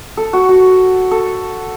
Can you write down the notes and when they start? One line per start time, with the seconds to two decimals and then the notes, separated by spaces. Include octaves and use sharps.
0.17 A4
0.33 F#4
0.49 F#4
1.11 A4